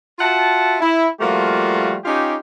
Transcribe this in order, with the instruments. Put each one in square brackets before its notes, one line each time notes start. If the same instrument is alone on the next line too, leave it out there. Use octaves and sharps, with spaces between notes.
[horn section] F4 F#4 E5 F#5 A5
E4
F3 G3 A3 A#3 F4 F#4
C#4 D#4 F4 G4